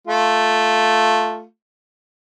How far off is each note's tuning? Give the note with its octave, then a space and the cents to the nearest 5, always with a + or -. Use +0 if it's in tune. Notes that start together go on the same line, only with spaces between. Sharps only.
A3 +0 F4 +0